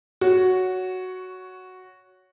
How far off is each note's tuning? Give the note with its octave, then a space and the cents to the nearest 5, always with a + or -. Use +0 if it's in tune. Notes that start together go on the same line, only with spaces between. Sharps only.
F#4 +0 C#5 +15